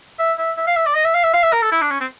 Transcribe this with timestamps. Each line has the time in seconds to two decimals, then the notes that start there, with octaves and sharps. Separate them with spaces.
0.19 E5
0.38 E5
0.57 E5
0.67 F5
0.76 E5
0.86 D5
0.95 D#5
1.05 E5
1.15 F5
1.24 E5
1.34 F5
1.43 E5
1.53 A#4
1.62 A4
1.72 E4
1.82 D4
1.91 C#4
2.00 C4